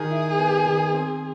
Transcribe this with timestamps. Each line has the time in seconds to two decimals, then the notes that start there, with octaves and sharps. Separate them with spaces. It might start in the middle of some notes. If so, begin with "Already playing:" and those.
Already playing: D#3 G#4
0.11 E4
0.38 B3
0.66 D#3
0.93 C4